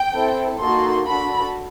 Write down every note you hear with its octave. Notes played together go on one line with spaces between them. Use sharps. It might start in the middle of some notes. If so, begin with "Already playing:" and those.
Already playing: G5
C4 E4 A4
A#3 D#4 F#4 A4 C6
D4 F#4 A4 B5